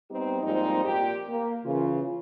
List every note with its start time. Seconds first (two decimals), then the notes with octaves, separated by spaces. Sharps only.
0.10 G3 B3 C4 D#4 G4
0.42 G#2 F3 G3 A#3 C4 D#4
0.84 A#2 G4
1.28 A#3
1.65 C#3 E3 F4